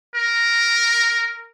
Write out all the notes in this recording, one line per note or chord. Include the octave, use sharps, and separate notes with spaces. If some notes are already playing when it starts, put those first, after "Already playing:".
A#4